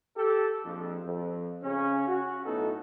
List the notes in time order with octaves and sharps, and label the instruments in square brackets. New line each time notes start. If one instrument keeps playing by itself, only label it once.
[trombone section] G4 A4
A#1 F2
F2
C#3 C#4
F#4
B1 A2 B3 D#4 A4